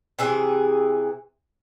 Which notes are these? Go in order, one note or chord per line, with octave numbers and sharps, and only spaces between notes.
C3 E3 G#4